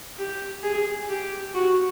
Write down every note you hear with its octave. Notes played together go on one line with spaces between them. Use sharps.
G4
G#4
G4
F#4